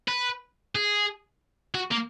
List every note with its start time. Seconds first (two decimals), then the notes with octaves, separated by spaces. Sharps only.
0.08 B4
0.75 G#4
1.75 F#4
1.91 A#3